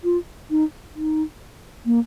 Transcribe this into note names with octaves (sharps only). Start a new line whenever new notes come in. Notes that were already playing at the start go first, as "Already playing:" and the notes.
F4
D#4
D#4
A#3